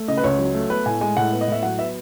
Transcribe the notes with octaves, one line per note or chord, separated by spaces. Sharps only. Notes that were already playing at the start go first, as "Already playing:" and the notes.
Already playing: A3
C#3 D#5
B4
C#2 C#5
F#3
A3
B3 B4
A2 G#5
G#3 G#5
A2 F#5
B3
D#5
A2 E5
F#3 F#5
B3 E5